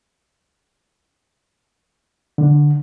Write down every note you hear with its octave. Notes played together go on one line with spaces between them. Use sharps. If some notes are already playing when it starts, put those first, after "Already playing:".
D3